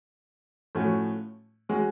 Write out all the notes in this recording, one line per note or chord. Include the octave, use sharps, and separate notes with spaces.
A2 F3 A3 C#4 F#4
G#3 C#4 F#4